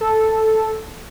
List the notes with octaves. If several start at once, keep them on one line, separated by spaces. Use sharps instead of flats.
A4